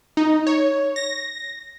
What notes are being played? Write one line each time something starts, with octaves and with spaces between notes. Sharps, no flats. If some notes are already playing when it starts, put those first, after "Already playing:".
D#4
C#5
A#6